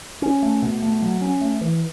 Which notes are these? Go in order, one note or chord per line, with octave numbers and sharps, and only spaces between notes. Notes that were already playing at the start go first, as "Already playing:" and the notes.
C#4
A3
B2
A3
F#3
C#4
A3
E3